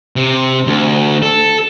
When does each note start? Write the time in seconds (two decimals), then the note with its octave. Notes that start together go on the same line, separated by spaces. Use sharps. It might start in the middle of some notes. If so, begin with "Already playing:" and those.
0.16 C3
0.67 D2
1.22 A4